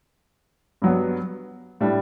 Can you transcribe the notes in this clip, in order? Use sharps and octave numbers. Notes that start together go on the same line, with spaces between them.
G2 F#3 B3
A2 G3 D4